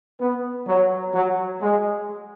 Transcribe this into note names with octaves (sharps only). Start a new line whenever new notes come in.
B3
F#3
F#3
G#3